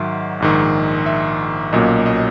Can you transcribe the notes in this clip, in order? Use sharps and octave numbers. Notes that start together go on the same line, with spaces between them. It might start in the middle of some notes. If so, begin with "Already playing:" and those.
Already playing: G#2 D#3 F#3 E5
A#1 G#2 D#3
E5
B1 A#2 F#3 A#3 C#4 D#5
D#5